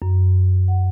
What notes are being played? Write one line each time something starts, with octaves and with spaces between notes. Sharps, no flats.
F#2
F#5